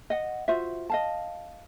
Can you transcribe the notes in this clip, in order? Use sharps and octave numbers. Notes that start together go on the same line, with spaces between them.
D#5 F#5
F4 F#4 C5 E5
D#5 F5 A5